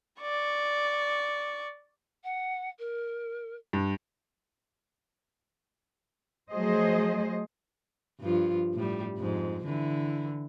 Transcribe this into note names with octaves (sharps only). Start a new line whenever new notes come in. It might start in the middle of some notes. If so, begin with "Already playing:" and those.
D5 C#6
F#5
A#4
G2
F3 F#3 A3 G#4 C5 D#5
G2 F3 F4
A2 G3
F2 G#2
D3 E3 E4